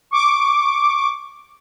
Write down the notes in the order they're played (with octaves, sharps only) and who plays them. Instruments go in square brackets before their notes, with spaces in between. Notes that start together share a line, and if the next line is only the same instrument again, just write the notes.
[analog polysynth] C#6 D6